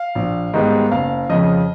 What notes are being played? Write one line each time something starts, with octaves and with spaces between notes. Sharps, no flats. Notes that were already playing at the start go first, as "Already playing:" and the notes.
Already playing: F5
A#1
G#2 D#3 G3 B3
F#1 F5
F2 C#3 F3 D#5